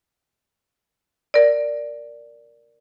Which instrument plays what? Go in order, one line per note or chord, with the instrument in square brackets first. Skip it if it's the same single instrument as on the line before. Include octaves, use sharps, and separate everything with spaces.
[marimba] A#4 D5